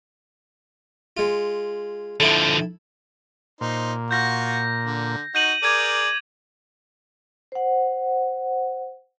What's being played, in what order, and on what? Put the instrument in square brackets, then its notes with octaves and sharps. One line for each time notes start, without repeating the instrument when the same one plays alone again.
[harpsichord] G#3 F4
[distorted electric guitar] D3 F3 [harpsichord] E4 A4
[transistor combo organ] A#2 [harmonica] D#4 C5
[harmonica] F4 F#4 [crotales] G6 A#6
[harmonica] D3
[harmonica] D#4 F#4 [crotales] G6 D#7 F#7
[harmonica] G#4 A#4 D5 [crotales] D6 G#6 D#7
[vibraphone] C5 F#5